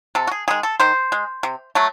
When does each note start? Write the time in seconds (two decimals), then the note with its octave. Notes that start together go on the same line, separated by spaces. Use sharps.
0.15 C3 A4
0.27 F#4
0.31 G#4
0.48 D#3 G#3 G#4
0.63 A4
0.80 D#3 C5
1.12 G#3
1.43 C3
1.75 F#3 A3